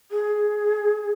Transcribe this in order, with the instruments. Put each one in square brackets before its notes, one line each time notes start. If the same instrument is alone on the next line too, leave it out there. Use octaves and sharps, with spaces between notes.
[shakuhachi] G#4